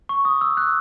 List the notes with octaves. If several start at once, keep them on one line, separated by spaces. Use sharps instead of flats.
C#6
D#6
E6
F#6